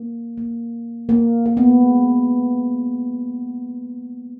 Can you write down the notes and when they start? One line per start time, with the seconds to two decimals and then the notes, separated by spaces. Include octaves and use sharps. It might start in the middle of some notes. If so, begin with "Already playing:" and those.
Already playing: A#3
0.37 A#3
1.09 A#3
1.46 A#3
1.57 B3
1.69 A#3
1.81 G#3